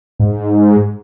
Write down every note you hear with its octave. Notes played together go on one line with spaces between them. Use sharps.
G#2